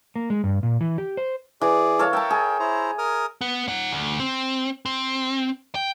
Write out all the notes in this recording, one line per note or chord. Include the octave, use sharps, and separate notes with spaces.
A#3
G#3
G2
A#2
E3
G4
C5
E3 G#4 D5
A4 C#5 F5
A#4 E5 G5 A5
G#4
E4 C5 A#5
A#4 D#6 F6
B3
D#4 F#5
D2
C4
C4
G5